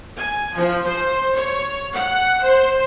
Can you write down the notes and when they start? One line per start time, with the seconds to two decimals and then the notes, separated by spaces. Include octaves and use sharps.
0.16 G#5
0.55 F3
0.85 C5
1.34 C#5
1.93 F#5
2.43 C5